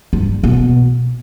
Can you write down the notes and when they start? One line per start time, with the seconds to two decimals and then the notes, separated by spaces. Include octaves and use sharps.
0.13 G2
0.43 B2